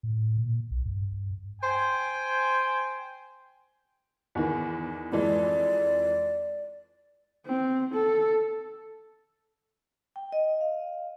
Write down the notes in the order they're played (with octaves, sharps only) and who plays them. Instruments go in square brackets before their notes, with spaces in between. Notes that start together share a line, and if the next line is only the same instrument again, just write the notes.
[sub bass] A2
A#2
B1
G2
[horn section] C5 G5 G#5
[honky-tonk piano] E2 D#3 E3
[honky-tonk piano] F2 E3 G#3 [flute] D5
[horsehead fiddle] C4
A4
[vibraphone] G5
D#5
F5